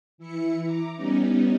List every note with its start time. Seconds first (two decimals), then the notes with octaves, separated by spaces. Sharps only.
0.18 E3 E4 E5 C#7
0.63 A#5 D6
0.95 G3 B3 C#4 D#4